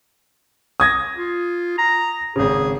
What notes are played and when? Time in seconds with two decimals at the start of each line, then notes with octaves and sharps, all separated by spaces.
0.80 D#6 G#6 A#6
1.17 F4
1.78 A#5
2.36 G#1 C#3 G#4